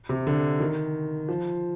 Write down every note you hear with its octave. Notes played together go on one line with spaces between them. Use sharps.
C3
D3
D#3
F3